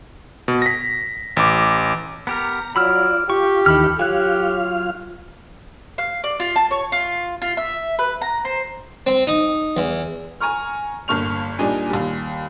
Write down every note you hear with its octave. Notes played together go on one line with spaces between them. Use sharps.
B2
A#6 B6
A1 D6
B3 G4 A#4 A#5
F#3 F4 D5 B5 E6 F6
F4 G4 C#6
D#2 D#3 E3 A4 B5 F6
F#3 F4 G4 C#5 F5 F#6
F5
D5
F4
A5
C#5
F4
F4
E5
B4
A#5
C5
C4
D#4
E2
G#5 A#5 C#6 F6
G1 G2 A#3 C#6 F6 F7
A#2 G3 D4 D#4 G#5
D#2 G3